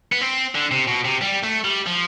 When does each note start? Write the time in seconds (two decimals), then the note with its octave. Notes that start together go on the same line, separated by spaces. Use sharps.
0.12 B3
0.21 C4
0.55 D3
0.71 C3
0.87 B2
1.05 C3
1.21 G3
1.43 A3
1.65 G3
1.87 F3